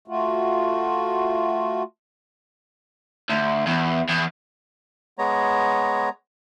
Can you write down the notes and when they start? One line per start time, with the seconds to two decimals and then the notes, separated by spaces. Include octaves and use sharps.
0.08 A3 F4 F#4
3.30 D2
3.67 E2
4.09 E2
5.18 G#3 B3 C#5 A#5